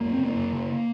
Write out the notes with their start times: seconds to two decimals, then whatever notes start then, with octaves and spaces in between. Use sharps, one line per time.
0.01 F#2 A#3
0.13 C4
0.18 C#3
0.25 A#3
0.35 F#2
0.52 C#3